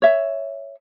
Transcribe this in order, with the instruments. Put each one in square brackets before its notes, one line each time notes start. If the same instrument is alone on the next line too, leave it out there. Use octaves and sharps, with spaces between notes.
[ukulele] C#5 E5